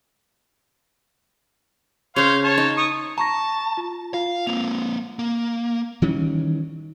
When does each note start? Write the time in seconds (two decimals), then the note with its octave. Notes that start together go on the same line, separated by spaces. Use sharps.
2.16 C#3 C5 C#5 F5 A#5
2.44 C#5 A5
2.58 D#4
2.77 C#6 D#6
3.18 A5 A#5 C#6 A#6
3.77 F4
4.14 F4 F5
4.47 A#3 C4 F7
5.19 A#3
6.02 D#3 E3 G3 C#4